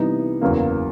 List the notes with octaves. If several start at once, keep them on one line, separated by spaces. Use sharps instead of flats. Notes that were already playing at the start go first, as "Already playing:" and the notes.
Already playing: C3 E3 G3 B3 D#4
F#1 E2 C#3 F#3 A#3